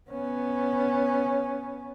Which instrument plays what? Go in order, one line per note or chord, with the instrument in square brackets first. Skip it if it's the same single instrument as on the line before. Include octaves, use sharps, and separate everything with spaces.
[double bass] B3 C#4